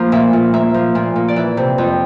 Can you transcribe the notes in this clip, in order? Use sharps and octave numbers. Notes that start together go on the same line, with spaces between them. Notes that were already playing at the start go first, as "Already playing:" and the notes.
Already playing: F3 A#3
A#2 E5
A#2
A#3 E5
F3
A#2
A#2
D5
E3 E5
C3
F2